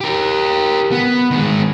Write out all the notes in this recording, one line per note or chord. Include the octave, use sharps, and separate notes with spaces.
G4 A#4
B3
D#3 G#3